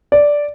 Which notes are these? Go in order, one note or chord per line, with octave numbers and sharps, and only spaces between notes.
D5